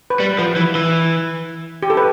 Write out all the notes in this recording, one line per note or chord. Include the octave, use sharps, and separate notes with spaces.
B4
G3
F3 B4
E3
E3
G4
A4
B4